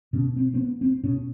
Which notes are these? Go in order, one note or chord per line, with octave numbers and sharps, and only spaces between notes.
B2 C#4
C4
C4
B3
C4
B2 C#4